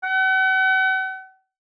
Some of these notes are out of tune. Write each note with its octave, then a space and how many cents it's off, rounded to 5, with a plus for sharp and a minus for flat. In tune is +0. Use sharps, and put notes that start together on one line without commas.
F#5 +40